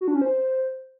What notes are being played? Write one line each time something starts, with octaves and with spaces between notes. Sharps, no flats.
F#4
D4
C#4
C5